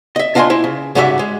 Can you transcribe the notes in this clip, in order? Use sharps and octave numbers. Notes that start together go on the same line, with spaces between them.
D#5 E5
D4 F4 D#5 E5 G#5 C6
E4 C5
C#3
G#2 C#3 G3 F#4 C5 E5
G#3